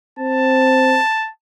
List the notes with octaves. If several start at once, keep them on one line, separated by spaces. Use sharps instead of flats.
C4 A5